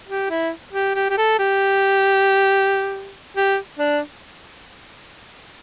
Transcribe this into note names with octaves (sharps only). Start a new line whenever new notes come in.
G4
E4
G4
G4
G4
A4
G4
G4
D4